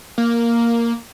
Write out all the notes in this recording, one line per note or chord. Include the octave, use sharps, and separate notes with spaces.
A#3